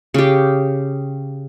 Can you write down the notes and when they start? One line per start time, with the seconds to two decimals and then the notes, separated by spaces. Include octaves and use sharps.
0.14 C#3 G4